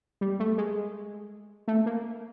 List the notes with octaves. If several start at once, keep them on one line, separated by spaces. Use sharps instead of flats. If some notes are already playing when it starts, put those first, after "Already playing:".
G3
A3
G#3
A3
A#3